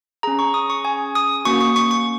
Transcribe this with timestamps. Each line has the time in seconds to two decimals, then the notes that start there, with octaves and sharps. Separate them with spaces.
0.23 C#4 G#4 A#5
0.39 C#6
0.54 D#6
0.70 C#6
0.85 G#5
1.15 D#6
1.45 A#3 C#4 F#4 C#6
1.61 C#6
1.76 C#6
1.91 C#6